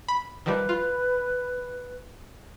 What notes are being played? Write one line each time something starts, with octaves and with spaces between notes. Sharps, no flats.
B5
D#3 F3 G3 B4
F4